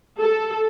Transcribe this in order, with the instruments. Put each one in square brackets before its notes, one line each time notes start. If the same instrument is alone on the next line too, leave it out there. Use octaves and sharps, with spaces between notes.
[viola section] A4